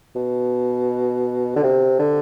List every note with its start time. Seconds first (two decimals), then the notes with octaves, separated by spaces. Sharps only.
0.15 B2
1.56 D3
1.63 C3
1.99 D3